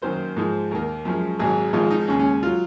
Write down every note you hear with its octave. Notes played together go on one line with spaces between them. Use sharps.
F#2 D#3 F#3 A#3 C5
G#2 F3 G#3
D#2 D#3 A#3 A#4
F#2 F3 G#3
G#1 G#2 F#3 G#4
G#1 G#2 F3 G#3 F4
D#4
D#2 C#3 G#3 C#4
C#4
F#3 F4